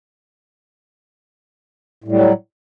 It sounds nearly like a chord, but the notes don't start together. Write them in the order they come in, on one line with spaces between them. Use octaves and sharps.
A2 G3 F#3